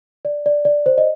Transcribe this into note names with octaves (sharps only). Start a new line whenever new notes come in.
D5
D5
D5
C5
D#5